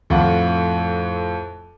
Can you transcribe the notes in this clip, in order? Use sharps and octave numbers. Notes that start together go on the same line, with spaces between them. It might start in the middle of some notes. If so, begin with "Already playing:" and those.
F2 A2 F4 F#5 D6